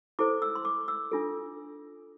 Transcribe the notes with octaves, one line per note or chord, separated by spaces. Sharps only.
E4 A4 C5 D6
E6
C6
D6
E6
D4 F4 A4